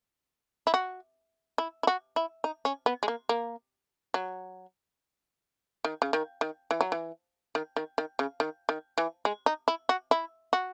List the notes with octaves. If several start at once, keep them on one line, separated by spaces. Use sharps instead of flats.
E4
F#4
E4
E4
F#4
E4
D#4
C#4
B3
G#3
A#3
A#3
F#3
D#3
C#3
D#3
D#3
E3
F#3
E3
D#3
D#3
D#3
C#3
D#3
D#3
E3
G#3
D#4
E4
F#4
E4
F#4